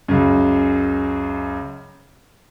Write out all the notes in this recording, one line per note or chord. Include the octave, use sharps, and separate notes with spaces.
C#2 F#2